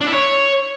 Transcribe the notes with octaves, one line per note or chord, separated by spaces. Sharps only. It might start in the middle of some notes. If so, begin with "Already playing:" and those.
D4
E4
C#5